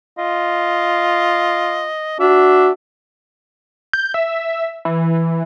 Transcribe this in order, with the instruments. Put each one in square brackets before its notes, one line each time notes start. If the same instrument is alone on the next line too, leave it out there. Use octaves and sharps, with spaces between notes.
[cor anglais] F4 [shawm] D#5
[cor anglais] D4 [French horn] F#4 [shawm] E5
[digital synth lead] G6
E5
E3